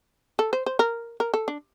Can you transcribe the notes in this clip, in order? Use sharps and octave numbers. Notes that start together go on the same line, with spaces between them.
A4
C5
C5
A#4
A#4
A4
D4